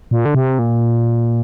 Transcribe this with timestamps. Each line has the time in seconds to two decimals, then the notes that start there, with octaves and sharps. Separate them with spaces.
0.11 A#2
0.25 D3
0.34 C3
0.59 A#2